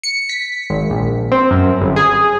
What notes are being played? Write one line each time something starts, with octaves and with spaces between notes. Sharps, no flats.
C#7
B6
G#1
A#1
C4
F#2
G1
G#4